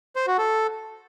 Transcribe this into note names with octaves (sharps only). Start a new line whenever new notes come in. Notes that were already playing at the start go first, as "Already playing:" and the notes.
C5
F#4
A4